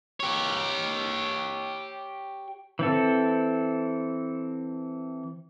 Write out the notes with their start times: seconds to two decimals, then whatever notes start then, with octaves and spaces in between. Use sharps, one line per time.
0.20 G4 C#5
2.79 E3 C4 A4